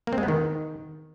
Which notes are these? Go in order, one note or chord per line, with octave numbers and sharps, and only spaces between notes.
A#3
C4
G#3
B3
D#3